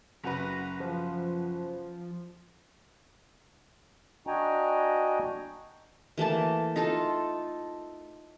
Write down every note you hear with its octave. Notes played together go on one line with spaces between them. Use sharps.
F#1 F#4 B4 A#5
F3
D4 F#4 D#5 G5 G#5 A#5
E3 A3 A#3 A5
D#4 F4 A4